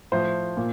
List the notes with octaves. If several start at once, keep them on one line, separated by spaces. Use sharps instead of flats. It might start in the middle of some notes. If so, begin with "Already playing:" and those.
A2 F3 C5
A#2